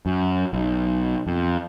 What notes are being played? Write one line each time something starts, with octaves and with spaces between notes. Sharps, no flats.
F#2
B1
F2